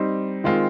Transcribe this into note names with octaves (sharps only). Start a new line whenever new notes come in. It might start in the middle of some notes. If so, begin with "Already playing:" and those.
Already playing: G3 C4 D#4
D#3 G#3 C4 F4